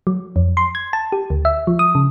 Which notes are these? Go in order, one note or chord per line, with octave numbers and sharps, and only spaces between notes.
F#3
F2
C6
G#6
A5
G4
D2
E5
F3
D#6
C#3